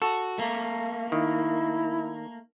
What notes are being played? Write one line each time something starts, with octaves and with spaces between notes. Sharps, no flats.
F#4 A4
A3 A#3
D#3 E4